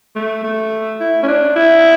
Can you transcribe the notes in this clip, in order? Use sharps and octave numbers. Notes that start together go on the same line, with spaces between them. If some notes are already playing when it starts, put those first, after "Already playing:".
A3
A3
E4
C#4
D4
D4
E4